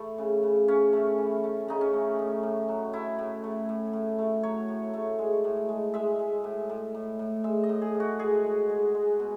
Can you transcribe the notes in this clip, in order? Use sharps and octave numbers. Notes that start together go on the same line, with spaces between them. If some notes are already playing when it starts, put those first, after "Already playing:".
Already playing: E3 A3 E4
C#3
C#3
C#3 C#4
A3
E3
A3
C#3 D#4
C#4
A3
A2
A2
F#3
A3 E4
A2
A3
A2
A2
A3
F#3 C#5
A2
A3
G#3
A2
G#3
G#3 E5
G#3
A2
A2
A2
A2
G#3 E5
D#5
A2
G#4
A2
F#4
G#3 G#4
G#3
G#3
G#3
B2